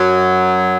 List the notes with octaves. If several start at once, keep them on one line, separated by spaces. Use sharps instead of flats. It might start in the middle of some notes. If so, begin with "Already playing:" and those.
Already playing: F#2 F#3